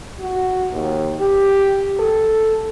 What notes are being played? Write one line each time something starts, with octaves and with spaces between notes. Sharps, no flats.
F#4
D#2
G4
A4